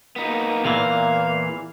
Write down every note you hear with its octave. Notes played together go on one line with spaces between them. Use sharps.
A#3 B3 D#4
E2 A#2 E3 F5